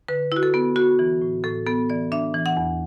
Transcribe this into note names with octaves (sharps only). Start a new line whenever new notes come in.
D3 B4
E4 F#4
A4
B3
B3 F#4
E3
A2
A2 A4
B3 A4
E3 D5
D4 E5
E3
F#5
E2